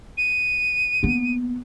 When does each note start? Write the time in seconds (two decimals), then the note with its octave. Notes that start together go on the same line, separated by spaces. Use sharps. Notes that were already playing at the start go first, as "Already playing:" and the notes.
0.18 D#7
1.03 A#3 B3